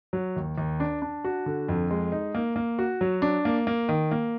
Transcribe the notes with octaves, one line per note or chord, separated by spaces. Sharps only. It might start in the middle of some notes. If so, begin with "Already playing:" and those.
F#3
D#2
D#2
D4
D4
F#4
D3
F2
G#3
D#4
A#3
A#3
F#4
F#3
D4
A#3
A#3
D#3
A#3